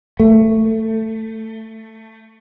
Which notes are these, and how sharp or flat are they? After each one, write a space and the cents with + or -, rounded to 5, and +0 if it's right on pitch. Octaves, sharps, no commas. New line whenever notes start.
A3 +15